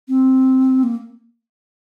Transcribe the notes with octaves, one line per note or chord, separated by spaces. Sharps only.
C4
A#3